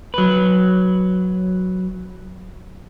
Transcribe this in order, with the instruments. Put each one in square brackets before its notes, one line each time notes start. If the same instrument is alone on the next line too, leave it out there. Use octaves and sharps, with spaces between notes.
[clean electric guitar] F#3 B4